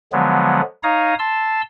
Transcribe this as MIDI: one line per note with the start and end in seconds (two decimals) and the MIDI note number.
0.13 0.61 50
0.13 0.61 53
0.13 0.61 54
0.13 0.61 56
0.13 0.61 59
0.83 1.14 63
0.83 1.14 73
0.83 1.14 77
0.83 1.14 82
0.83 1.14 87
1.19 1.62 81
1.19 1.62 84
1.19 1.62 88